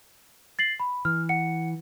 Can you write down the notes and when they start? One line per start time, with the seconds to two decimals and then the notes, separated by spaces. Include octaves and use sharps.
0.59 A6 C7 F#7
0.80 B5
1.05 E3 F6
1.29 F#5 C#7